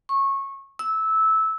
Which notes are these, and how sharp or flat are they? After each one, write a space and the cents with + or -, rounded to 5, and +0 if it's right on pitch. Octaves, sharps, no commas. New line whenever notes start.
C#6 -20
E6 -15